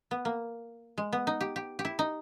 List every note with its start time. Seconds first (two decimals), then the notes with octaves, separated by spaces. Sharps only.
0.11 B3
0.25 A#3
0.98 G#3
1.13 B3
1.27 D#4
1.41 G4
1.56 G4
1.79 G4
1.85 E4
1.99 D#4